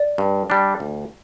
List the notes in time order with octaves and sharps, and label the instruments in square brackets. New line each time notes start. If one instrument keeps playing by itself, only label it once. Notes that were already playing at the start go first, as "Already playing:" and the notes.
Already playing: [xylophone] D5
[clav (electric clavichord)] G2
G3 D4
D2